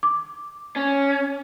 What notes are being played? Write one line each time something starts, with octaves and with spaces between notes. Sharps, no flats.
D6
C#4